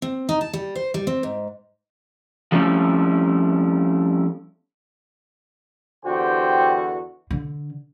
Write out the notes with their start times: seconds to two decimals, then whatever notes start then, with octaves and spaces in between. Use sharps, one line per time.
0.02 C4
0.29 D#4
0.41 A5
0.53 G3
0.76 C5
0.94 G3
1.07 C4
1.23 G#2
2.52 F3 G3 A3 C4 C#4 E4
6.05 E2 D3 F#4 G4 C5 G5
7.31 D3